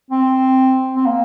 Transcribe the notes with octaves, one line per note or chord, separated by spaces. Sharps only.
C4
C4
A#3